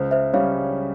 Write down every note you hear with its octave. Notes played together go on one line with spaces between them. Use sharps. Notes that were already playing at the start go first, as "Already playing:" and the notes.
Already playing: C#2 C5
C5 E5
C#3 G3 C#4 C#5 F5